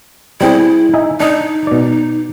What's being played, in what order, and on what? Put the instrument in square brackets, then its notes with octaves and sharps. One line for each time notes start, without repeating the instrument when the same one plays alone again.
[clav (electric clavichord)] G3 C4 G#4 [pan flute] E4
[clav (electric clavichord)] D#4 E5 G#5
[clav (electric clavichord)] D4 D#5 [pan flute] D#4
[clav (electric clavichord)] B2 D5